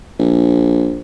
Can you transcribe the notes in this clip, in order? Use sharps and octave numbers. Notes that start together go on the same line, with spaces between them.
A#1